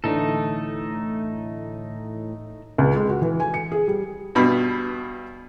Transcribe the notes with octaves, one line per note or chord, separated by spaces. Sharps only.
A2 D3 E3 A3 D#4 A4
C#2
G#3
F#4
E3
G#5
C#7
G#4
G3
G2 B2 B5